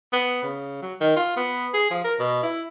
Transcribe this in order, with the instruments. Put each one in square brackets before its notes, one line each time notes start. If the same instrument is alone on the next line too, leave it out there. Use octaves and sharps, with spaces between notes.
[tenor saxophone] B3
C#3
F#3
D#3
F4
B3
G#4
F3
A#4
B2
E4